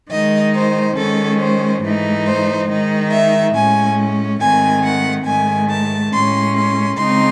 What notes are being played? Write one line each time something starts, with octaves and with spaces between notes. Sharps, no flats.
D#3 G#3 D#4 D#5
C5
D#3 G#3 C#4 A4
C5
G#2 E3 A3 D#4
C5
D#3 G#3 D#4
E5
A2 G#3 C#4 G#5
G#2 D#3 A3 C4 G#5
F#5
G#2 D#3 A3 G#5
A5
A2 G#3 C#4 C6
C6
C#3 G#3 C4 D#4 C6